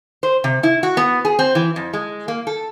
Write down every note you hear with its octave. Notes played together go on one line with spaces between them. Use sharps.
C5
C3
E4
F#4
B3
G#4
C4
E3
F2
G#3
A#3
A4